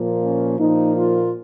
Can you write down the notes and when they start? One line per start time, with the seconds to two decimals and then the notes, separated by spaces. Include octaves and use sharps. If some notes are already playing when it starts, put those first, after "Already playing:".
Already playing: A#2 F3 A#3
0.22 C#4
0.59 A#2 F3 A#3 D#4
0.96 F4